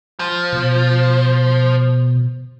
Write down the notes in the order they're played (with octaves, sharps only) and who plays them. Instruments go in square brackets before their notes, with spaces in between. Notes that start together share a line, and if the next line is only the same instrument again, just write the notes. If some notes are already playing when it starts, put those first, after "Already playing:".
[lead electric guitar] F3
[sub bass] B2